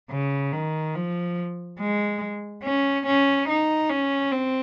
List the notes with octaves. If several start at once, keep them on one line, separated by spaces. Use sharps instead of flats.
C#3
D#3
F3
G#3
C#4
C#4
D#4
C#4
C4